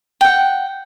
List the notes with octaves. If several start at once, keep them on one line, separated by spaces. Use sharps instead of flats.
F#5 G5